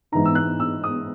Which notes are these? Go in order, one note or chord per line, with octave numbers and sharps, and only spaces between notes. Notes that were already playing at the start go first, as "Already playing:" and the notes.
G#2 E3 G#3 B3 D#4 A#5
E6
F#6
E6
D#6